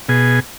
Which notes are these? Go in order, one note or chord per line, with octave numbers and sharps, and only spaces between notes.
B2 G#4